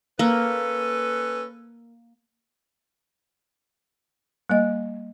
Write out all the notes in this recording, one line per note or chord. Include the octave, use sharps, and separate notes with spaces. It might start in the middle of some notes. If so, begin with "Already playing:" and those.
A#3 C#4 A4 B4
G3 A#3 D#5